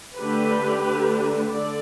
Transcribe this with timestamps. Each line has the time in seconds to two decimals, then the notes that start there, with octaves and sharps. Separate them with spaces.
0.17 D3 A3 D4 G4 B4
0.84 D3 A3 D4
1.51 D3 A4 D5